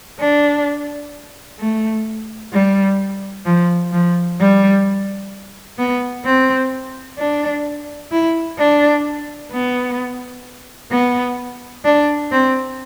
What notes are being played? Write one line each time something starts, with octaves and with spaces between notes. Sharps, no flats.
D4
A3
G3
F3
F3
G3
B3
C4
D4
E4
D4
B3
B3
D4
C4